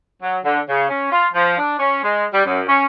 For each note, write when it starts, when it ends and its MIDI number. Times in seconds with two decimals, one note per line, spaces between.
0.22 0.37 54
0.43 0.59 50
0.68 0.86 49
0.89 1.09 61
1.11 1.27 65
1.33 1.57 53
1.58 1.75 62
1.79 2.01 61
2.03 2.25 56
2.32 2.42 55
2.46 2.62 42
2.67 2.85 61